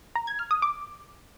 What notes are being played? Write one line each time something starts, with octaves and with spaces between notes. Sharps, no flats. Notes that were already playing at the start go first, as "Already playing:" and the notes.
A#5
G#6
F6
D#6
D6